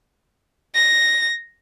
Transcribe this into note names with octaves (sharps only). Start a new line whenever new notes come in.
A#6